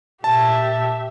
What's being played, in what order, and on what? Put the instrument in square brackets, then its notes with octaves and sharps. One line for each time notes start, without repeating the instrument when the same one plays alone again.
[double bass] A#2 [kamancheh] G4 E5 [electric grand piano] A5